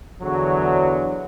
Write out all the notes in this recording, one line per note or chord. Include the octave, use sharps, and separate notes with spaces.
E2 D3 F#3